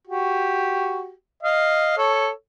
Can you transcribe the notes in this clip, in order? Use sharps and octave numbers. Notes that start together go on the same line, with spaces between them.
F#4 G4
D#5 F5
A4 C#5